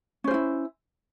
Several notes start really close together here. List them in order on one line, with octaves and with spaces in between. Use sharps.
C#4 C5 F4 E4